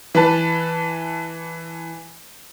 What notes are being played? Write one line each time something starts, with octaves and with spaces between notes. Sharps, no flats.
E3 B4 A5